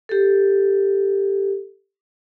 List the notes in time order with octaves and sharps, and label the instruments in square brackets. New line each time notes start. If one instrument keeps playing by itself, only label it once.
[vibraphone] G4 A4